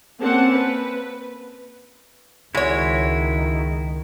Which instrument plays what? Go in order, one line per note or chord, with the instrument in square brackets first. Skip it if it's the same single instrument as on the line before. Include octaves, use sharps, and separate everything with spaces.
[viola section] A#3 C4 C#4 F#5 A5
B4
[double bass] C#2 D#3 [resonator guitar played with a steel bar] G#3 C#5 [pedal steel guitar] E4 F#4